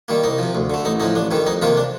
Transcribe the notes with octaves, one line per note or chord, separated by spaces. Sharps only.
D#3 G3 A#3
C2 D#4
C3 F3
D2
D3 A3
A1 D#4
A2 F3 D#4
A1 D4
G2 D#3 G3
F2 D#4
C3 D#3 A#3 F4
D4